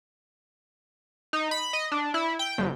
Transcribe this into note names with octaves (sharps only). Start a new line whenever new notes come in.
D#4
B5
D#5
D4
E4
G5
G1